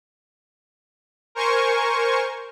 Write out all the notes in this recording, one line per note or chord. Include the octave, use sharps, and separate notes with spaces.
A#4 C5 G#5 C#6